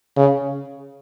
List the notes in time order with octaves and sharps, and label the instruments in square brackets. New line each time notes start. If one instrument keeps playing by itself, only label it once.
[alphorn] C#3